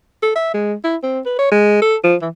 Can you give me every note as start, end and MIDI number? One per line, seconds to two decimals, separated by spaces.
0.22 0.34 69
0.35 0.52 76
0.54 0.74 56
0.84 0.96 64
1.03 1.20 60
1.26 1.37 71
1.39 1.51 73
1.51 1.80 56
1.82 1.96 69
2.04 2.16 53
2.22 2.29 52